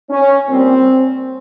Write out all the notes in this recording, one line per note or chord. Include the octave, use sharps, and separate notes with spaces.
C#4
A#2 G3 C4